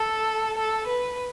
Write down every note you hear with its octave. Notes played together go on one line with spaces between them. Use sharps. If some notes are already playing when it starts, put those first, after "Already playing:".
Already playing: A4
A4
B4